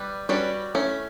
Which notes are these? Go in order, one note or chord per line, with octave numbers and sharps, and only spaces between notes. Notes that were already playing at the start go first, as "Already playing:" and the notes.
Already playing: G3 B4
G3 C#4 F#4 B4 D5
A3 C#4 E4